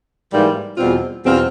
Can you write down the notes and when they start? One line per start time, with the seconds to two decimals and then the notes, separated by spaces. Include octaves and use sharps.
0.32 G#2 E3 G3 A#3
0.78 E2 B2 G3 C4 F4
1.24 E2 B2 G3 C4 F4